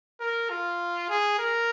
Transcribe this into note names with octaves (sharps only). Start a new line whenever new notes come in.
A#4
F4
G#4
A#4